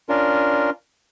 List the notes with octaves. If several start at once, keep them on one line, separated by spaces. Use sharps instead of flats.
C#4 D4 F4 A#4